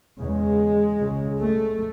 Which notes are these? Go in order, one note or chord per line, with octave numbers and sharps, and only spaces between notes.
E2 C#3 G#3
C#2 C#3
A3